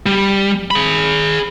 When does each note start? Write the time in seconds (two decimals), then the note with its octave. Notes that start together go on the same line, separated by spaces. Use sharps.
0.06 G3
0.71 G#4 B5